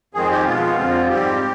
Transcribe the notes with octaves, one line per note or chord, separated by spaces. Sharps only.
F2 D#3 G#3 C4 G#4
G4
B2 G#3 B3 F4
F2 D3 F3 C4
G#2 G3 C4 G4